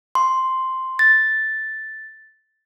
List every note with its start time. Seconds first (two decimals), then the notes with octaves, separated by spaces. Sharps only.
0.15 C6
0.99 A6